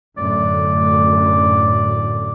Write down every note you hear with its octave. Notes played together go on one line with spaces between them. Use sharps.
F#2 A2 D3 D5